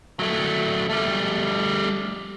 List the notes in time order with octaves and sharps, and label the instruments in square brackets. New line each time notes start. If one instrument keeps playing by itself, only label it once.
[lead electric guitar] F#3 A3
G3 A3